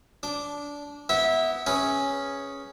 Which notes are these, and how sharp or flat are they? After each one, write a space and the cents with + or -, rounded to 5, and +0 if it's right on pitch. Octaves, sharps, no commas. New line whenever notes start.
D4 -20 D6 +0
B3 +0 E4 -20 E5 -20
C#4 +0 G#4 +0 B4 +0